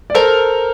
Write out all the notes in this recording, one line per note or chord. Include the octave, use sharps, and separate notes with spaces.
D5
A4 A#4 C5